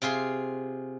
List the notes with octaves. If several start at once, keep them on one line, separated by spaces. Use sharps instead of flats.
C3 F4 G#4 C6